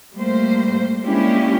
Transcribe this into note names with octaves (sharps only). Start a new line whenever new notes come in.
G3 A3 A#3 C5
G#3 A#3 C#4 D4 E4 G4